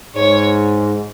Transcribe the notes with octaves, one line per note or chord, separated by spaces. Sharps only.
G#2 C#5